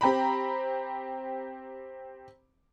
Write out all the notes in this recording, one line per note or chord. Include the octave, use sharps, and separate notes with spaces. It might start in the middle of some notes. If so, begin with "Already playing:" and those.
C4 G4 A#5 B5